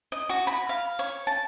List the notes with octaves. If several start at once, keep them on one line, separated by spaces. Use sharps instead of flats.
D#5
F#4
B5
F5
C#5
A5